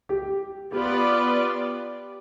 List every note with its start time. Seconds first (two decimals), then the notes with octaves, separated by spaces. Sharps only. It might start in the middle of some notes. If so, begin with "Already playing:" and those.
0.09 G4
0.72 B3 F4 G4 B4 D5